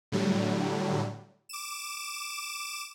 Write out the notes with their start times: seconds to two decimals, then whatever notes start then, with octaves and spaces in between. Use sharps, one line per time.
0.12 A2 D3 F#3 G3
1.49 D6 E7